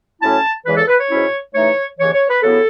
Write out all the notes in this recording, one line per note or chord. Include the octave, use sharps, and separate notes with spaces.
A2 F#3 C#4 E4 A5
E2 C#3 E3 G#3 B4
A4
B4
C#5
G#2 F#3 C#4 E4
C#3 E3 A3 D#4 C#5
D#2 C#3 E3 C#5
C#5
B4
C#3 F#3 B3 E4 A4